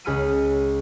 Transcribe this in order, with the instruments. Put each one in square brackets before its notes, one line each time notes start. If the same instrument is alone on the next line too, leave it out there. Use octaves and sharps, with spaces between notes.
[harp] C#2 G#4 B5 F6 C#7 D#7